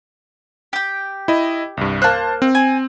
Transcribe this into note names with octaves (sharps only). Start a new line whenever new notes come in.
G4 G5
E4 D#5
C2 G2
A#3 C5 A5 F#6
C4
G#5